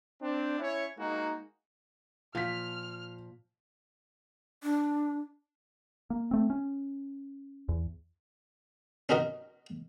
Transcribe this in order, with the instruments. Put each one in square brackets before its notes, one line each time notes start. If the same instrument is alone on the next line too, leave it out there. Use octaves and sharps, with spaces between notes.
[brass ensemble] C4 D4
C#4 E4 C#5
G#3 A#3 D#4 F#4
[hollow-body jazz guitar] A#2 [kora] F3 [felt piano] F5 B6 [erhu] F6
[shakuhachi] D4
[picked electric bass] A#3
A3 C4
C#4
E2
[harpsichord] C#4 D#4 F#4 A#4 D#5